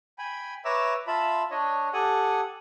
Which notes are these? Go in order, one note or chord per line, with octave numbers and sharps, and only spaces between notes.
G5 G#5 B5
B4 C#5 E5 A#5 D6 E6
F4 E5 A5 B5
D4 C#5 D#5
G4 A4 F#5 G#5 D#6